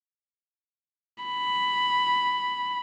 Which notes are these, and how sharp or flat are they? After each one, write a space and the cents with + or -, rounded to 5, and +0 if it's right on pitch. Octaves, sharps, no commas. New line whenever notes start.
B5 +5